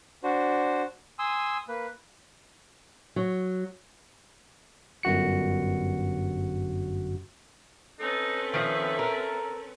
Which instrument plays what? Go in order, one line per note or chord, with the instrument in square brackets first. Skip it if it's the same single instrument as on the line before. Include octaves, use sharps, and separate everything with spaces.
[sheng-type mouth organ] D4 F#4 C5
G#5 C6 D#6 E6
A#3 B4
[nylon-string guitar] F#3
[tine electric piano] G1 F#2 F#4 C#7
[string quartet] C4 C#4 B4 [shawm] D#4 [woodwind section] A4
[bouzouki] D#3 F3 [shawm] E5
[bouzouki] A#4